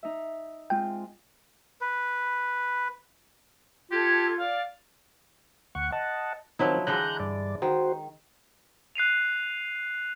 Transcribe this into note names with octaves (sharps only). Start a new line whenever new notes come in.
D#4 E5
G#3 C4 F4 G5
B4
F4 G4 A4 G#6
D5 F5
D2 F#5 C#6
D#5 F#5 A5
D#3 F3 F#3 C4 D#4 E4
D3 E3 G#3 A#5 F#6 G6
G2 D5
D#3 F#4 C5
F#6 C7 D#7 F7